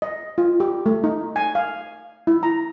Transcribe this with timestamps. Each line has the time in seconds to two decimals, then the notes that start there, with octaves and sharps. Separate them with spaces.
0.02 D#5
0.38 F4
0.60 G4
0.86 A3
1.04 D#4
1.36 G#5
1.55 F5
2.27 E4
2.43 A#5